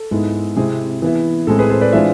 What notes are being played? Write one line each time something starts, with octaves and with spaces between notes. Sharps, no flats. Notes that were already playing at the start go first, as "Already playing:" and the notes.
Already playing: A4
G#2 G#3 B3 E4
C3 G#3 C4 E4 G#4
E3 B3 E4
A2 G#3 C4 A4
G#4 B4
A4 C5
B4 D5
E3 G#3 D4 F4 C5 E5